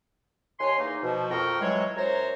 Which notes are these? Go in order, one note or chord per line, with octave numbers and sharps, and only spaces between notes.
D#2 C#5 G#5 C6
E2 A#3 D#4
B2 F3
F2 A#4 G5 A#5 C#6
E3 F#3 G#3 C#5
F#2 C5 C#5 A#5